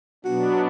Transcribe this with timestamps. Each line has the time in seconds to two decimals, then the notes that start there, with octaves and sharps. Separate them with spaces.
0.25 B2 F#3 B3 D4 F#4